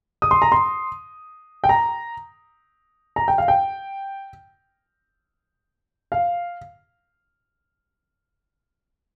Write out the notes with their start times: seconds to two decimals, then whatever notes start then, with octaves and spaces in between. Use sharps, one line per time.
0.22 D#6
0.31 C6
0.42 A#5
0.52 C6
1.64 G5
1.69 A#5
3.16 A#5
3.28 G5
3.38 F5
3.48 G5
6.12 F5